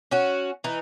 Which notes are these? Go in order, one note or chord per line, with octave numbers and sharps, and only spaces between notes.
C#4 F#4
E3 D#4